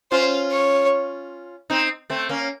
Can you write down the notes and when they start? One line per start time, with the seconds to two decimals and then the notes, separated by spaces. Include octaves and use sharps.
0.11 C#4 F4 C5
0.51 C#5
1.70 C4 D#4
2.10 A3 C4
2.29 A#3 C#4